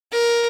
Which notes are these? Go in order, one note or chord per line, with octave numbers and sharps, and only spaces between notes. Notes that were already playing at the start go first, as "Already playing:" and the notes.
A#4